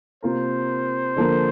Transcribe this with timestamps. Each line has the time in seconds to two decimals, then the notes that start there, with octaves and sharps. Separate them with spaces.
0.23 C3 A#3 F4 A#4 C5
1.16 D3 F3 A#3